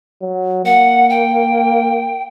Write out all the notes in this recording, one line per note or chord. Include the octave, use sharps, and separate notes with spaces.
F#3
A#3 F#5
G5